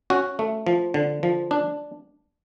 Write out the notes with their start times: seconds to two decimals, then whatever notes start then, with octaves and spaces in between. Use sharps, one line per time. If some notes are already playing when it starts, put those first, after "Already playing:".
0.10 C#4 F#4
0.39 A3
0.67 F3
0.94 D3
1.23 F3
1.51 D4